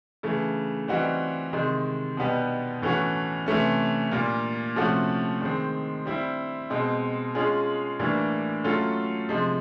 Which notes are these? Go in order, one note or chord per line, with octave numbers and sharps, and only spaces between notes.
C#3 E3 A3
E3 G3 C4 D#4 F#4
C3 D#3 G#3
B2 G3 B3 D#4 G4
A2 E3 A3 C#4 F#4
C3 E3 A3 C#4
A#2 G3 A#3
C3 F3 A3 C#4 F#4
D#3 G#3 C4
G3 C4 E4
B2 G#3 C4
G#3 C#4 F4 G#4
A2 E3 G3 A#3 D4
F#3 A3 C#4 F4 A4
C3 F3 G#3